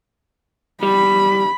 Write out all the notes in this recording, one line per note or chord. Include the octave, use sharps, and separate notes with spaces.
G3 B5